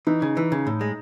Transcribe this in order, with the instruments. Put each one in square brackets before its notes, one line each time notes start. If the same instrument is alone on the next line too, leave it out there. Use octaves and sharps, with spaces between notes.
[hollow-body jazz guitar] E3 [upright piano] D#4
[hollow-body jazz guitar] C#3
E3
C#3
A2
G#3